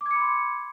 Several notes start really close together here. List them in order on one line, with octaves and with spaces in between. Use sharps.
D6 G#6 C#7 B5 C6